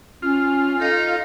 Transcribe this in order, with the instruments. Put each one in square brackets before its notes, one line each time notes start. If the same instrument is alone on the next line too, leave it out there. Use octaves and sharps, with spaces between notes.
[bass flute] C#4 [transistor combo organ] F4
[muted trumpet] D#4 [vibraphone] A4 D#5 [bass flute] F5